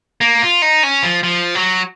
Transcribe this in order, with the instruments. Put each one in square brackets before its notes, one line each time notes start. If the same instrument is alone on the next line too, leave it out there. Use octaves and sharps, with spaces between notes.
[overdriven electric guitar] A#3
F4
D#4
C#4
F3
F3
F#3